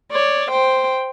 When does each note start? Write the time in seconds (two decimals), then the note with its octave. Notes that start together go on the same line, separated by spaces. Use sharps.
0.12 C#5 D5
0.51 C5 G5